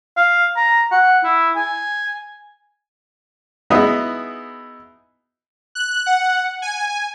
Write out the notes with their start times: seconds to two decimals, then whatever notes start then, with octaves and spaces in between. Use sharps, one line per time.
0.17 F5
0.56 A#5
0.92 F#5
1.24 E4
1.56 G#5
3.70 B3 D#4 E4 F#4 G#4 B4
5.75 F#6
6.06 F#5
6.62 G#5